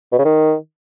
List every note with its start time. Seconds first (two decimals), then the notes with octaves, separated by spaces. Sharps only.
0.12 B2
0.19 C#3
0.25 D#3